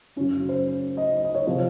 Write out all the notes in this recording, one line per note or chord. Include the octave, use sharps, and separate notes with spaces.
F#2 C#3 F#3 C#4
C5
D#5
D#5
C#5
C3 F3 C4